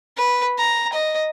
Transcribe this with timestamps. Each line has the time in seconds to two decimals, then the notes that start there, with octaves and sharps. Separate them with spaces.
0.17 B4
0.58 A#5
0.93 D#5